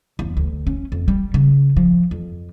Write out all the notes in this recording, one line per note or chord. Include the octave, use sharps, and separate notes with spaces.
E2
D2
C#4
F2
G3
C#3
F3
F2